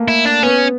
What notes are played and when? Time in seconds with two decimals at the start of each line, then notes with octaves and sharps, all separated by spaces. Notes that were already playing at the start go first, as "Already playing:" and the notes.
Already playing: A3 A#3
0.08 E4
0.25 D4
0.43 B3 C#4